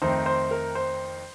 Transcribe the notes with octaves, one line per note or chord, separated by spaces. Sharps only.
F2 D#3 A3 C4 D#4 C5
C5
A#4
C5